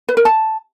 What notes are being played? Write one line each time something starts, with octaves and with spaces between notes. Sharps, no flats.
B4
A#4
A5